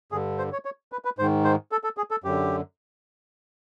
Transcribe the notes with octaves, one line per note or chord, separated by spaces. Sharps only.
G2 D3 G#4
C5
C#5
C#5
B4
B4
G#2 D#3 C5
C5
A4
A4
G#4
A4
F#2 D3 G4